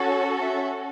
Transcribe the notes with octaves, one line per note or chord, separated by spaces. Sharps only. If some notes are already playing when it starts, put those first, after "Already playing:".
Already playing: C#4 F#4 A4
E5